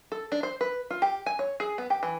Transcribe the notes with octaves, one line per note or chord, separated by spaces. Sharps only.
A4
D4
C5
B4
F4
G4
G#5
C#5
G#4
B3
G4
E3